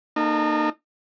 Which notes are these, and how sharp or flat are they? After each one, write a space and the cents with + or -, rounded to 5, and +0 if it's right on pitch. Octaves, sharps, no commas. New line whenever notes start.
A#3 +0 D#4 -30 A4 +0